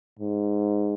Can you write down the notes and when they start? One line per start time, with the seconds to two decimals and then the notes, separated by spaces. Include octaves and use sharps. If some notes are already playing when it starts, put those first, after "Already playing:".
0.19 G#2